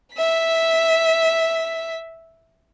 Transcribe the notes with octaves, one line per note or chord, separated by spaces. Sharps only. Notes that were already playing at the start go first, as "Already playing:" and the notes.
E5 B6